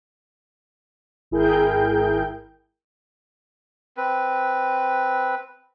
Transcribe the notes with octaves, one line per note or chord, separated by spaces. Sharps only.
G#1 E4 G#4 A#4 G5 G6
C4 B4